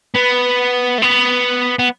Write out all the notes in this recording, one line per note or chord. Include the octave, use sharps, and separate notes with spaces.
B3
A3
B3
B3